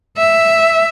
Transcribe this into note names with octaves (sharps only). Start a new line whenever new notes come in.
E5